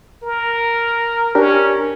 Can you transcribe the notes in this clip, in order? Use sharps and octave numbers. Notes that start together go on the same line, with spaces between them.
A#4
C#4 D4 G4 A#4